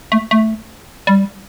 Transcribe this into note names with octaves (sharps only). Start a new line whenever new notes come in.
A3
A3
G3